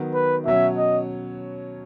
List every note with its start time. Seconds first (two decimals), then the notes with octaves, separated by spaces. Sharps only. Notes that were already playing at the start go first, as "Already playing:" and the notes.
Already playing: D#3 F#3 B3
0.14 B4
0.45 B2 F#3 C#4 E5
0.77 D#5